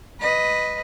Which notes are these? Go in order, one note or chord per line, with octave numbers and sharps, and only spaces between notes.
B4 D#5